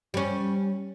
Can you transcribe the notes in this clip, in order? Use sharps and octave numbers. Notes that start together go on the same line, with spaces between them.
G3 C#4